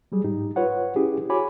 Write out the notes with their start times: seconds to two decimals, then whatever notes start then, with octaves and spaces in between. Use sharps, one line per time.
0.12 F#3 G3 G#4
0.24 G#2 D#4 G4
0.56 F4 B4 C#5 F#5
0.96 C#4 E4 G4 G#4
1.29 F#4 G#4 C#5 G#5 B5 D6